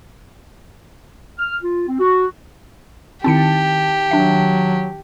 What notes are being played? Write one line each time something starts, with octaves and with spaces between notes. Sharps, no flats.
F6
F4
C4
F#4
D#3 C4 E4 G4 A5 C#7
F#3 D4 E5